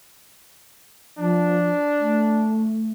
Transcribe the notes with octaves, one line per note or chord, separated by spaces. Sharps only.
F3 D4
A3